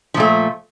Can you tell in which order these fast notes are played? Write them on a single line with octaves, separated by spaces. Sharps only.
F3 A#2 A3